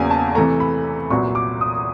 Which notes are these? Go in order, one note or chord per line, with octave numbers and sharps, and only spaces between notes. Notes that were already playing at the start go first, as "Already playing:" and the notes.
Already playing: E2 C#3 F#3 A#3 G#5
A5
C3 E3 A3 A#5
B5
C2 A#2 F#3 B3 C#6
D6
D#6